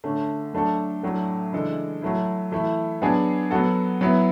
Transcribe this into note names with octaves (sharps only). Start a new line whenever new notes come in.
D3 A3 C#4
F#3 A3 D4 A4
A2 F#3 A3 D4
C#3 E3 G#3 D4 A4
F#3 A3 E4
E3 A3 E4
F#3 B3 D4 G#4
F#3 B3 F#4 A4
F#3 B3 E4